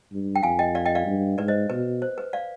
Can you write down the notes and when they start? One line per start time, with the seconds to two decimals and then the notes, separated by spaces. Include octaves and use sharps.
0.12 G2
0.36 G5
0.43 F2 F5 G#5
0.59 D#5 G5
0.75 D5 F5
0.86 D#5 G5
0.95 D5 F5
1.06 G2
1.38 G#2 B4 D5
1.48 C5 D#5
1.70 B2 B4
2.02 C5
2.18 B4
2.33 D5 F5